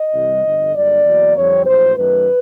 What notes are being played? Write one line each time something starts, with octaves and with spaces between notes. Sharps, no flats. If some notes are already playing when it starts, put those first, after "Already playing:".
Already playing: D#5
C2 C3 E3 G3
G1 F2 D3
G2 D3 F#3 A#3 D5
E2 B2 F#3 A#3
F2 D3 G3 C4 C#5
A#1 A2 F#3 C5
F#2 D#3 F#3 A3 B4